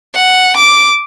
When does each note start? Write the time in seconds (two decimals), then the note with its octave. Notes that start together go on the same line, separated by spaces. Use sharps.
0.15 F#5
0.56 D6